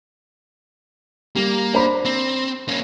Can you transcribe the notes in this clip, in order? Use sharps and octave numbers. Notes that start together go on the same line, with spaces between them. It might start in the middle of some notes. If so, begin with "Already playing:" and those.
G3 A#3
D4 C5 B5
C4
A#3 C#4